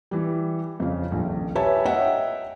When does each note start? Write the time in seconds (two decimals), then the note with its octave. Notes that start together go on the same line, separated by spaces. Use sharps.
0.11 E3 G3
0.80 F2 C#3
1.12 D#1 A#1
1.55 G4 B4 C#5 E5 G#5 A5
1.86 C#5 D#5 E5 F#5 G5